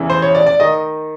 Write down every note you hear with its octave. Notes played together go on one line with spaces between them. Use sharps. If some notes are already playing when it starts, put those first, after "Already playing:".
Already playing: F1 E2 C#3 E3
C5
C#5
D5
D5
D#3 D#5